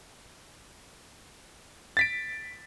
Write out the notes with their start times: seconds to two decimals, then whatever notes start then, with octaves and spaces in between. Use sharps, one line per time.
1.97 A6 B6 D7